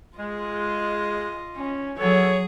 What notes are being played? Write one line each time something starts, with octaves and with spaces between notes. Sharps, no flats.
G#3 F4 D#5
C#4
F#3 B3 G#4 A4 C#5